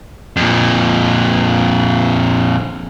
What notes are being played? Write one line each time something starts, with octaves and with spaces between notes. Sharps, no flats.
F2 A#2